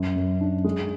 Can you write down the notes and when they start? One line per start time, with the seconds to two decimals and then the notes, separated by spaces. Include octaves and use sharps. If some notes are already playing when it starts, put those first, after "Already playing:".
Already playing: F#2
0.16 F#2
0.41 D4
0.64 G#3